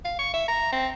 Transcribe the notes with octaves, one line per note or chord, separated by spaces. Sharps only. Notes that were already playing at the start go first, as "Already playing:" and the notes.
F5
C#6
E5
A#5
C4